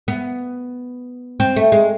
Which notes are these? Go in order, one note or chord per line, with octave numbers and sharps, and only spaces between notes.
B3
C4
A3
G#3